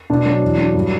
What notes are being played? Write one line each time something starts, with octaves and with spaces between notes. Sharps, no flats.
B2 D4
F#3
E2
F#3
G2